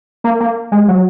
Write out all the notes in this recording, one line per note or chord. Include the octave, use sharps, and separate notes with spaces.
A#3
A#3
G#3
F#3